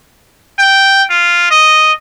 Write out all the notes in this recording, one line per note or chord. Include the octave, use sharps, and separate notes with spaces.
G5
F4
D#5